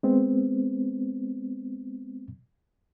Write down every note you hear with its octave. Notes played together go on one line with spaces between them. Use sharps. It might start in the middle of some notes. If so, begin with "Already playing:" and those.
G#3 B3 C4